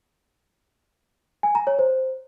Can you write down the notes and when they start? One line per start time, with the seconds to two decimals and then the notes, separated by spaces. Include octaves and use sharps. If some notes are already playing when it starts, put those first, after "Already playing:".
1.43 G#5
1.55 A#5
1.67 C#5
1.79 C5